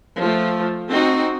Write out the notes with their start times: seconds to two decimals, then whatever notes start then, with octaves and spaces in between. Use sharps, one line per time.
0.19 F3 A3
0.89 C4 D#4 F#4